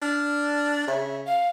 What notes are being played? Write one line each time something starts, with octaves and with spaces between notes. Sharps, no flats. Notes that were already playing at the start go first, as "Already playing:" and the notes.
D4 F6
C#3 E5
F5